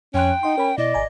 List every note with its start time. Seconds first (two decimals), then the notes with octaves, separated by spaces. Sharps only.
0.14 F2 C#4 G5 C6 F#6
0.43 D#4 D#5 F#5 C6
0.57 C#4 A#4 B5
0.78 B2 E4 D5 D#5
0.94 G#1 G#5 A#5